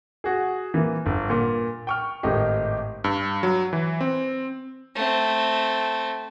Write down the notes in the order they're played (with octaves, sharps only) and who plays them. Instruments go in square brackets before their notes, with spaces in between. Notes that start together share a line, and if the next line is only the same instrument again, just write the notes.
[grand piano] F#4 G#4
E3 A#3
G1
A#2
G5 C#6 F6
G#1 A2 D#4 G4
[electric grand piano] G2
F#3
E3
C4
[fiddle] A3 C4